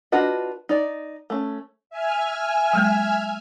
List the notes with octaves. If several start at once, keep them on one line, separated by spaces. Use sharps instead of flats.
D4 F4 F#4 B4 D#5
D#4 D5
A3 C#4
E5 G#5 F6
F#3 G#3 A#3